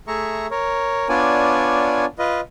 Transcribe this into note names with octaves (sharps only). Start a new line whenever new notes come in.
A3 G#4 E5 A#5 C#6
A#4 C#5
B3 D4 F4 C#5 D5 G#5
F4 B4 D#5